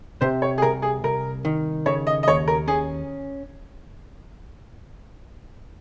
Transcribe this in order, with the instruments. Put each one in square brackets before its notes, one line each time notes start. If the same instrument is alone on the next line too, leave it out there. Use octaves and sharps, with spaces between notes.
[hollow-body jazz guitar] C3 [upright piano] C5
[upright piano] C#5
G#4
[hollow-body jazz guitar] C2 [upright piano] A#4
[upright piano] G#4
[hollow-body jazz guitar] C2 [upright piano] A#4
[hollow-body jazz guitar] D#3
[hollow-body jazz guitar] C#3 [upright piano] C#5
[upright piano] D#5
D#5
[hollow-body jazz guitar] D#2 [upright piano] C#5
[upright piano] A#4
[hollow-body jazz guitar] C#4 [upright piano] G#4